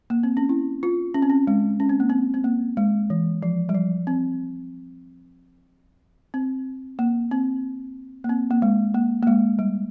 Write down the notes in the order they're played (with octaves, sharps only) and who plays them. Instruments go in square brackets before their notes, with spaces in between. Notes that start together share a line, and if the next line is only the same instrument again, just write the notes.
[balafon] A#3
C4
C#4
E4
F4
C#4
C4
C#4
G#3
C#4
C4
A#3
C4
C4
A#3
G#3
E3
F3
G3
F3
C4
C4
A#3
C4
A#3
C4
A#3
G#3
A#3
A#3
G#3
G3